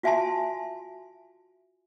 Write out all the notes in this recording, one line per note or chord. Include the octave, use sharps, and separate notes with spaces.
F4 F#4 E5 G#5 A5 C6